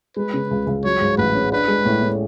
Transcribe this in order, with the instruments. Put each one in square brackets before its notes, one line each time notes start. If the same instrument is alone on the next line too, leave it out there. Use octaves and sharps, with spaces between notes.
[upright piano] G#3 [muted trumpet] B4
[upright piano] C#3
C#2
C#2
[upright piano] F#3 [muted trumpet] C#5
[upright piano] G#2
[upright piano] A1 [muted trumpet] B4
[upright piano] C#4
[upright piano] D4 [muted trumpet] B4
[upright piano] G#3
A2
A2